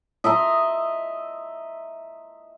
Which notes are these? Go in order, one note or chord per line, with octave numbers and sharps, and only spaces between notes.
D#5 E5 A#5 C6